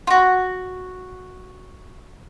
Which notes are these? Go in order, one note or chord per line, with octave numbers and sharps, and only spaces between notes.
F4 F#4